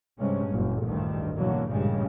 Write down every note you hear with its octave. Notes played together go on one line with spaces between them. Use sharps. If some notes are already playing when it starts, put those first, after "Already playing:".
G2 C3 G#3 C#4
F#1 A#2
A1 D2 G2 D#3
B2 D3 E3 F#3 A#3
A1 G2 A#2 C#3 G3 G#3